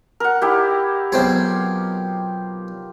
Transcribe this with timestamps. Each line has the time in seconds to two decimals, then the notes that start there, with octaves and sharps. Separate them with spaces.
0.20 A#4 F#5
0.42 D#4 E4 G4
1.12 B1 C4 F4 G#4 G5